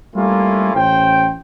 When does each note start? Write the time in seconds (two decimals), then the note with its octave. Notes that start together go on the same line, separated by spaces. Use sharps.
0.15 G3 A3 A#3 C#4 E4 F4
0.75 A1 C#4 C5 G5